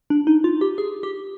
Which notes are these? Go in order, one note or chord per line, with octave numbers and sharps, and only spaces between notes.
D4
D#4
F4
G4
G#4
G4